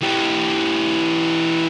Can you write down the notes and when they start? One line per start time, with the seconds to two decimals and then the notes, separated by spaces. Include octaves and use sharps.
0.01 E3 G4